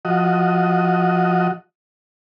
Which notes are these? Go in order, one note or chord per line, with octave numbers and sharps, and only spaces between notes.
F3 F#4 D#5